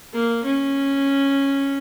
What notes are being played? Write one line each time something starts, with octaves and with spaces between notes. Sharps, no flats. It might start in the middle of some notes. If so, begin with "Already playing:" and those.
A#3
C#4